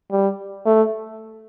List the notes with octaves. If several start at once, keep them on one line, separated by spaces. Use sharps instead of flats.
G3
A3